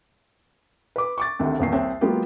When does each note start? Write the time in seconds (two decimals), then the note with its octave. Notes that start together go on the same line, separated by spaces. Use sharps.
0.96 B4 D6
1.18 C#6 D6 A6
1.39 D2 C3 D#3
1.60 D#1 E2 C7
1.73 C2 C4 C#5
2.01 F#3 G#3 A#3 B3 F4 G4